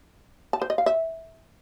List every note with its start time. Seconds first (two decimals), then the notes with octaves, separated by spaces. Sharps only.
0.53 A5
0.62 C5
0.70 D#5
0.78 F5
0.86 E5